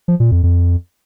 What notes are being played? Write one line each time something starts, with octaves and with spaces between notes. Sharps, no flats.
F3
A#2
F2
F2